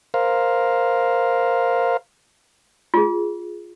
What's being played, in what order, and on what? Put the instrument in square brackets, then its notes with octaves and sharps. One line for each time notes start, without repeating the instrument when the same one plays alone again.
[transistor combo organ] A#4 C5 F5
[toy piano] F4 G#4